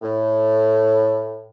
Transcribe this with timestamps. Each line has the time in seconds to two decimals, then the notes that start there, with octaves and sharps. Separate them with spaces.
0.02 A2